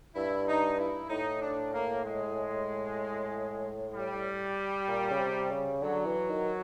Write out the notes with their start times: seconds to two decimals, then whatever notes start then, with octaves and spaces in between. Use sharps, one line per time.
0.16 G2 E4
0.47 D#4
0.79 E4
1.10 A2 D#4
1.41 D4
1.73 A#3
2.04 G#3
3.94 G3
4.88 A#2
5.11 C#3
5.20 C3
5.51 C#3
5.82 D3 F#3
6.06 E3
6.30 D#3